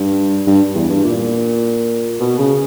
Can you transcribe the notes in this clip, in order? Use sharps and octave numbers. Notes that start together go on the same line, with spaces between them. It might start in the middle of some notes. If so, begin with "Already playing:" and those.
Already playing: G2
G2
E2
G2
A#2
B2
C#3